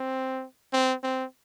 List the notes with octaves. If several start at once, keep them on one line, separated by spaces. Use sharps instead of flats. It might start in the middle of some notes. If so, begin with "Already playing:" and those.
Already playing: C4
C4
C4